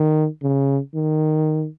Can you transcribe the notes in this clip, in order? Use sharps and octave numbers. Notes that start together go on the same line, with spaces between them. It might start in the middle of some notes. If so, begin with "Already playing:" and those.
Already playing: D#3
C#3
D#3